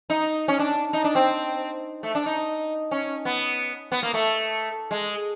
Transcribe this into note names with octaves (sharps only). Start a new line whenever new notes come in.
D#4
C#4
D4
D#4
D4
C4
A3
D4
D#4
C#4
B3
B3
A#3
A3
G#3